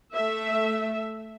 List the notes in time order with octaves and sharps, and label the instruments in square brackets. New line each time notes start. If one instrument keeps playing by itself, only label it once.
[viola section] A3 E5